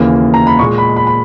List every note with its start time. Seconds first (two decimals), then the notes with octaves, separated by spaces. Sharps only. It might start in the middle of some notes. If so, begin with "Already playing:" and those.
Already playing: D#2 C#3 E3 A#3
0.34 A#5
0.47 B5
0.59 A#2 G#3 C#6
0.78 B5
0.97 B5
1.07 B5